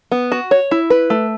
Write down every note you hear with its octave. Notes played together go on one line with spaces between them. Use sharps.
B3
F#4
C#5
E4
B4
A3